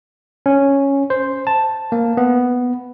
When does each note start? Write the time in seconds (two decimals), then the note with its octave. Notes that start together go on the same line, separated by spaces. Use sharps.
0.46 C#4
1.10 C5
1.47 A5
1.92 A#3
2.17 B3